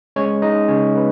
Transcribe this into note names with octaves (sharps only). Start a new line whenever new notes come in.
G#3 C#4 C#5
G#3 D#4 D#5
C#3 C#4 C#5
C#3 B3 B4